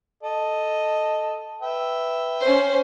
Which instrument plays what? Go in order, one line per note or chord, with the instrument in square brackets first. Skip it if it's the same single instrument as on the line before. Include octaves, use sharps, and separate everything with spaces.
[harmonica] A4 D#5
B4 E5 G5
[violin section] C#4 C5